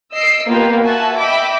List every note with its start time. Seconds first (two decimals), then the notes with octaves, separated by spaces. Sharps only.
0.11 D#5 E6 C7 D7
0.47 A#3 B3 F4 G4 B4
0.83 F#4 E5 G#5 A5
1.17 D#5 E5 G5 B5 D6